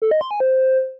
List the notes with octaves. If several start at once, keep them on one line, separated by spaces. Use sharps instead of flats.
A4
D#5
C6
G#5
C5